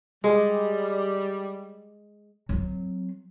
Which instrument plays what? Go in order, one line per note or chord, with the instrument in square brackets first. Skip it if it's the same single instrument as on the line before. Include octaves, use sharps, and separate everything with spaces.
[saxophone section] G3 [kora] G#3
[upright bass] F#3 C4